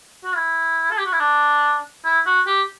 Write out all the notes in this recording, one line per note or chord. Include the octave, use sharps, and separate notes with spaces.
F#4
E4
A4
G4
F#4
E4
D4
E4
F#4
G4